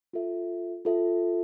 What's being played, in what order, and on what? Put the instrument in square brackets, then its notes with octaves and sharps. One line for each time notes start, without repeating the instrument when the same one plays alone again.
[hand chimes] F4 A4 E5
F4 A4 E5